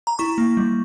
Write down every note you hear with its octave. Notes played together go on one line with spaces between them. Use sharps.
A#5
E4 C#6
A#3
G3